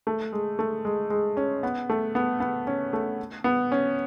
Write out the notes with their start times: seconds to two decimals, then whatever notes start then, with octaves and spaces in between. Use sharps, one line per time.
0.07 A3
0.33 G#3
0.59 A3
0.85 G#3
1.10 G#3
1.37 C#4
1.63 B3
1.89 A3
2.15 B3
2.40 B3
2.67 C#4
2.93 A3
3.44 B3
3.72 C#4